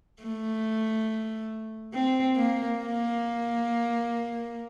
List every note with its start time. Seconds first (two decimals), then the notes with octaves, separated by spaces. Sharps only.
0.23 A3
1.93 C4
2.36 A#3
2.79 A#3